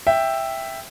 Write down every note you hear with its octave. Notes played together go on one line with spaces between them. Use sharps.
E5 G5